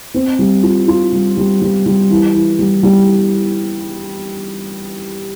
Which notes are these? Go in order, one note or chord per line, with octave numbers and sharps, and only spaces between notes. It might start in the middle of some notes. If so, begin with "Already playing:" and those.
C4
G3
F4
F4
G3
G3
G3
G3
E3
E3
G3
G3